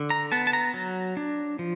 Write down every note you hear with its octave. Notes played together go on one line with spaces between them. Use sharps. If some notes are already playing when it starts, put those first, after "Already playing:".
Already playing: D3
A#5
B3 A5
A5
A#5
F#3
D4
F3